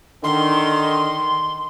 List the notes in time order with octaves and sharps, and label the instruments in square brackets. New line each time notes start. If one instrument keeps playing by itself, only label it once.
[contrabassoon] D3 [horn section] D#3 [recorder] C6